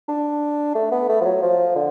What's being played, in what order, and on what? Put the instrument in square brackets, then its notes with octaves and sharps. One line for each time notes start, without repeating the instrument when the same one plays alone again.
[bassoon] D4
A3
B3
A3
F3
F#3
F3
D3